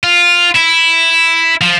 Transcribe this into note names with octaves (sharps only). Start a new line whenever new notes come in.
F4
E4
F3